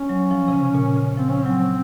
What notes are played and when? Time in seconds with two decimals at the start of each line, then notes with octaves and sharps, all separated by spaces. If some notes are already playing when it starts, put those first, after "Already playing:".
Already playing: C#4
0.09 F#3
0.31 F3
0.48 C3
0.52 C#3
0.74 A#2
0.96 C#3
1.17 F3 C4
1.30 C#4
1.43 F#3 C4